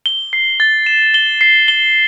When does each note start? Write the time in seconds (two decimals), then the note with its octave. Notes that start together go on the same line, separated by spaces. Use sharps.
0.06 G7
0.33 C7
0.60 A6
0.86 E7
1.14 G7
1.41 C7
1.68 G7